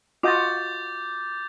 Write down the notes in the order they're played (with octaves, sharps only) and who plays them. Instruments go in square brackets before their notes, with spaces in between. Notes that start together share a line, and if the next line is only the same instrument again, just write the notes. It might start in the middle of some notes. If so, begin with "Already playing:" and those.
[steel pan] F4 F#4 D#5 [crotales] D6 G6 A6